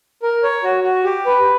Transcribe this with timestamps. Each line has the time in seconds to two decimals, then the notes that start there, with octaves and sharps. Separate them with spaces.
0.23 A#4
0.43 C#5
0.64 F#4
0.84 F#4
1.04 G4
1.26 B4